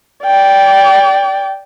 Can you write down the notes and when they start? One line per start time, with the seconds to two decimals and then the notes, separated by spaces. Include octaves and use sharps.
0.24 D5 G5